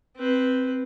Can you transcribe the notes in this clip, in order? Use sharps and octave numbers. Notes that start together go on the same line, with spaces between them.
C4 B4